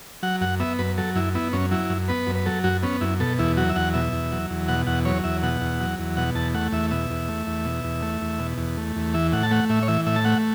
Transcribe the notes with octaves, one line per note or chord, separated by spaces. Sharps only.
F#3 F#5
F#2 F#5
B3 E5
F#2 B4
F#3 A4
F#2 E4
B3 E4
F#2 C#4
F#3 E4
F#2
B3 B4
F#2
B4
F#3 A4
F#2 F#4
B3 C#4
F#2 E4
B2 A4
E2 E4
F#3 F#4
E5
E2 F#5
B2 E5
E2
F#3
E2
B2 F#5
E2 F#5
F#3 C#5
E2 E5
B2 F#5
E2
F#3
E2
B2 F#5
E2 A5
A3 F#5
E2 E5
B2 E5
E2
A3
E2
B2
E2
A3
E2
B2
E2
A3
E2
E3 E5
A2 F#5
A5
A3 F#5
A2 E5
C#5
E3 E5
A2 E5
A5
A3 F#5